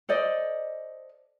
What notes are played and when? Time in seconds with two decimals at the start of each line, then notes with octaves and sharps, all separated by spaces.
0.09 A4 C5 D5 D#5